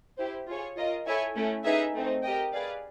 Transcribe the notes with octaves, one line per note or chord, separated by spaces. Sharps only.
E4 G4 C5
F4 G#4 C#5
F4 A#4 D#5
E4 A4 C#5 E5 G#5
A3 C#4 E4
D#4 G#4 B4 E5
A3 C4 D#4
G4 A#4 D#5 G5
G#4 B4 D5 F5